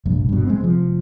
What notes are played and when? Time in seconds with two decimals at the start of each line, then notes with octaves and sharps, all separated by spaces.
0.06 F1 A#1 G2
0.29 G2 B2
0.47 G#3 C4
0.60 F1 F3